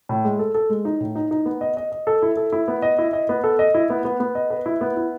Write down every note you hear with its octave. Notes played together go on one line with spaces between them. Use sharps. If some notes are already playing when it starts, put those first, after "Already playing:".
A2
G#3
A4
A4
G#3
D#4
A2
D#4
D#4
B3
D#5
D#5
D#5
A4
E4
A4
E4
B3
D#5
E4
D#5
B3
A4
D#5
E4
B3
B3
B3
D#5
B4
E4
B3
E4